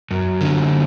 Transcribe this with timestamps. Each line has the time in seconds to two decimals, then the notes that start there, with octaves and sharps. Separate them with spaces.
0.11 F#2
0.41 D3